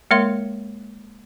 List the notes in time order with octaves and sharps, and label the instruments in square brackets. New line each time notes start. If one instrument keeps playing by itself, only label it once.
[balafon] G#3 A#3 A#4 C#5 E5 C6